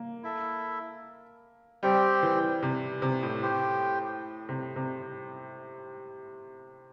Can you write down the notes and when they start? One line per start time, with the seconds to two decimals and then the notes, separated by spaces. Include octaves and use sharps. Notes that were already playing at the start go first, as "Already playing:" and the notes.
Already playing: A#3
0.23 E4 A4 E5
1.83 G3 C4 G4 C5 G5
2.23 E3
2.63 C3
3.02 C3
3.23 A2
3.43 G4 C5 G5
4.49 C3
4.76 C3